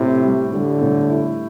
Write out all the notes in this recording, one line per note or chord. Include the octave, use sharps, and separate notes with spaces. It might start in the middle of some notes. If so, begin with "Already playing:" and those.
Already playing: A2 C3 E4
G3
D3 G3
A2
E4